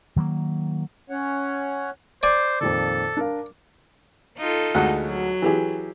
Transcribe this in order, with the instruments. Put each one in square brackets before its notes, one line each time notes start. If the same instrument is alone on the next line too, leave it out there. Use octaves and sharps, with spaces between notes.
[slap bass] D#3 F#3 G#3 A#3
[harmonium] C#4 C#5 F#5
[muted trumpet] C5 [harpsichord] D5 G#5
[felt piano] F2 A#2 D#3 [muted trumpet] A4
[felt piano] D4 A#4 F5
[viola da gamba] D#4 F4 A4
[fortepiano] D2 G#3 F#5
[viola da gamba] F#3
[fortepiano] E3 G4 G#4